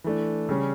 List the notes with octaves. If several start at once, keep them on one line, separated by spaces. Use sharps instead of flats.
E3 A3 D4
C#3 G3 C#4